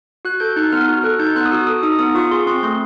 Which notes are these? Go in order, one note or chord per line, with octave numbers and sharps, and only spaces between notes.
F#4 F#6
A4 G6
D#4 F#6
B3 F6
F#4
A4 F#6
D#4 G6
B3 F#6
D#6
F#4 E6
A4 D#6
D#4 D#6
B3 D#6
F4 C#6
G#4 C6
C4 C6
A3 C6